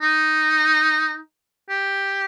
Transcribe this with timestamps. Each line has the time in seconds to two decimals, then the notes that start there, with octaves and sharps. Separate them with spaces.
0.02 D#4
1.69 G4